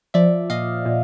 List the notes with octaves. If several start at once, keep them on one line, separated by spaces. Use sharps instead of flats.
F3 D5 E5
A#2 D#5 F5
A#2